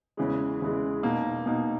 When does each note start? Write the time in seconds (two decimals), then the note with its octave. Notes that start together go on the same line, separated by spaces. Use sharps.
0.17 E2 C#3 E3 G#3
0.61 E2 C#3 E3 G#3
1.03 B2 A#3 D#4
1.46 B2 A#3 D#4